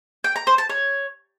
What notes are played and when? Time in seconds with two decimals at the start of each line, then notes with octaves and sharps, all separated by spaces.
0.24 G5
0.36 A#5
0.47 C5
0.58 A5
0.69 C#5